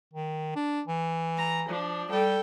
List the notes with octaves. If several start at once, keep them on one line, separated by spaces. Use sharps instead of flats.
D#3
D4
E3
A#5
F3 D4
G3 A4 G5